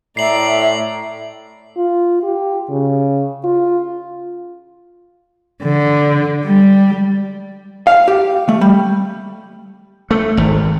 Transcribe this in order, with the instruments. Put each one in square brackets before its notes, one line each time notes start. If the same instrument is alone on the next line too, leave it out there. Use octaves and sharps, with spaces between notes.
[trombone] A2 [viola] D5 A#5 [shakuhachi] E5 [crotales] C7 F#7
[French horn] F4
G4
C#3
F4
[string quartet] D3
G3
[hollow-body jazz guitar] F5
G4
A3
G3
[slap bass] A3
G#1